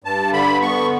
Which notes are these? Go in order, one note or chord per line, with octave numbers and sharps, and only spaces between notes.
G2 A5
D3 B5
B3 C#6